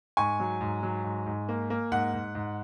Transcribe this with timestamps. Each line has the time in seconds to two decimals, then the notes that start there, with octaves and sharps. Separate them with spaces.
0.17 G#2 G#5 C#6
0.40 F#3
0.61 G#2
0.83 F#3
1.04 G#2
1.26 G#2
1.49 A#3
1.70 A#3
1.92 G#2 F#5
2.13 G#2
2.35 G#2